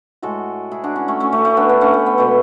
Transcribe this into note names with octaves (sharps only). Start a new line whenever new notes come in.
A2 G#3 F#4 A4
E4 G#4
D4 F#4
C#4 E4
A3 C#4
A3 C#4
A3 C#4
A3 C#4
B3 D4
B3 D4
A3 C#4
A3
B3
B2 G#3 A3